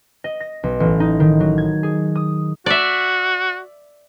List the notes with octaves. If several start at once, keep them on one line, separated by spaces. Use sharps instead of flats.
D#5
A#6
B1
A1
D#4
D#3
F#3
G#6
G#4
D#6
F#4 D5 E5